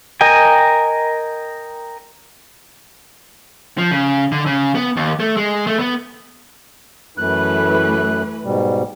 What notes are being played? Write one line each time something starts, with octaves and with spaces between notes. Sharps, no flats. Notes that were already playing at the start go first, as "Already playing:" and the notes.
A#4 D#5 G5 G#5
F3
C#3
D3
C#3
B3
D#2
A3
G#3
A3
B3
F#2 E3 A3 B4 F#6
G#2 B2 G3